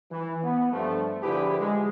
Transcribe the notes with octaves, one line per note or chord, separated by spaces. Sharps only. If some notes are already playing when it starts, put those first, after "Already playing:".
E3
B3
G2 F3 A3
D3 F3 E4 G4 G#4 B4
G#3